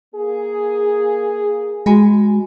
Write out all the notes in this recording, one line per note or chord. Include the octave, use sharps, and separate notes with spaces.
A#3 G#4
G#3 F#4 G#5 B5